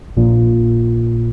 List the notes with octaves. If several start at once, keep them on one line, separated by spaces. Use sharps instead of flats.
A#1 A#2